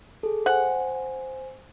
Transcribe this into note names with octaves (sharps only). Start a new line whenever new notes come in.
G#4 A4
C5 F#5 G#5